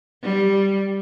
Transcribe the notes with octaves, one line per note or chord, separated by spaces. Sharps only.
G3